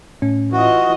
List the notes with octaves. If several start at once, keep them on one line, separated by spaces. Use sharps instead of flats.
A2 C#4
E3 F4 F#4 D#5